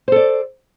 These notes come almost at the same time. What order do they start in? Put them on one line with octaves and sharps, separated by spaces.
C5 A4 D5